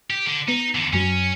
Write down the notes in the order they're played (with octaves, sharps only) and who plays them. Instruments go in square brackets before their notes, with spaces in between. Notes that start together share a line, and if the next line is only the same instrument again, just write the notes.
[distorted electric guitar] G4
D3
[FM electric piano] B3 [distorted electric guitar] D#4
[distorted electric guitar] E2 D3
[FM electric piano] F#2 F#3 [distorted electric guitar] C#4